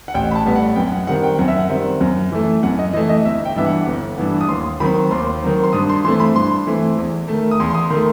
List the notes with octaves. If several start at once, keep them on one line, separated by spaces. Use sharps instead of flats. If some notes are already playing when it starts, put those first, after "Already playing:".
F#5
A1 G5
B5
A5
A2 G3 B3
F#5
F#2 G5
F#5
D#3 G3 C4 F#5
G5
F#2 F#5
E5
F#5
D#3 G3 C4
F#2
E3 A3
F#2 F#5
D#5
E3 A3 D#5
D#5
G1 E5
G5
G2 E3 B3 E5
F#5
G1
G2 E3 B3
D#6
D#2 C6
D#3 F#3 C4 B5
D#2 C6
D#3 F#3 C4
C6
G2 D#6
C6
E3 A3 C4 C6
B5
G2 C6
E3 A3 C4
E2
D#3 A3
D#6
E2 C6
C6
D#6
D#3 A3 C6